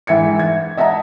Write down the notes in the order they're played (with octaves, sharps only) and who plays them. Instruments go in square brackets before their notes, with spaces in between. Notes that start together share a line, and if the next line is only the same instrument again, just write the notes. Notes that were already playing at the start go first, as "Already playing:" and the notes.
[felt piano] G#2 E3 E5 G#6 C#7
G#6
D#5 E5 F#5 A5 A#5